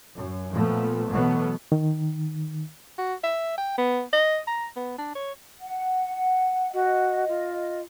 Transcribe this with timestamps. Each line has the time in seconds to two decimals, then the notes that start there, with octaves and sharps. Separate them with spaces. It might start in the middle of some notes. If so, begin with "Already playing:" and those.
0.13 F#2
0.52 A#2 F3 A3 B3
1.10 B2 E3 F#3 A3 B3
1.72 D#3
2.98 F#4
3.24 E5
3.58 G5
3.78 B3
4.13 D#5
4.47 A#5
4.76 B3
4.98 D4
5.15 C#5
5.60 F#5
6.73 F#4 D#5
7.28 F4